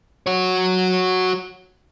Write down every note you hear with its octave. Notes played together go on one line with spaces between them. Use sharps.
F#4 C#5